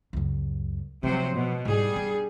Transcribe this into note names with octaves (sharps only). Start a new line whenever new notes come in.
C#2 F#2
C3 F3 F#3 G#3 C5
B2
G#2 G3 E4 G#4
D4